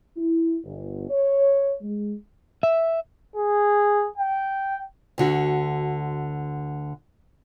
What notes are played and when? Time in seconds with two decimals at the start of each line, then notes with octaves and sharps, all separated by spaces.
0.17 E4
0.64 G1
1.09 C#5
1.81 G#3
2.63 E5
3.36 G#4
4.18 G5
5.18 D2 D3 F#4